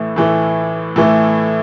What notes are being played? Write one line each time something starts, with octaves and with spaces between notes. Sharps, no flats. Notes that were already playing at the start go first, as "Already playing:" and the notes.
Already playing: A2 E3 A3
A2 E3 A3
A2 E3 A3